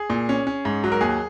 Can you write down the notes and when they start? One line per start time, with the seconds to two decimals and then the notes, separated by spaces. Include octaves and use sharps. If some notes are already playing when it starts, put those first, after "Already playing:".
Already playing: G#4
0.10 A#2
0.29 C#4
0.47 C#4
0.65 G#2
0.84 F#3
0.92 A#4
1.01 D#2 G#4